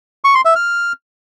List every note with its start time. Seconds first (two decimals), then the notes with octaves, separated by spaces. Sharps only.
0.24 C#6
0.35 C6
0.45 E5
0.56 F6